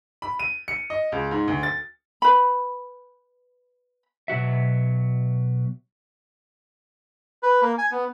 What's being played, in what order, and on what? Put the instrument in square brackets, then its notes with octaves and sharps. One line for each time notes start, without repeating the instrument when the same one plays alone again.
[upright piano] B5
D#7
C#7
D#5
C#2
G#2
D2
A6
[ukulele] B4 B5
[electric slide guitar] B2 F#3 F#4 E5
[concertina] B4
A#3
G#5
B3